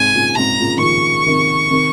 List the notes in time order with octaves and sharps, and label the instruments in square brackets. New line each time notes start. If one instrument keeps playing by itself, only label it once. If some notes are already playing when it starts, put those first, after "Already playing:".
Already playing: [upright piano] G#2 C3 [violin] G#5
[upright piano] A#2 C#3
[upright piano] G#2 C3 [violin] A#5
[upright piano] A#2 C#3
D#3
[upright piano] C#3 F3 [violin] C#6
[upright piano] C3 D#3
C3 D#3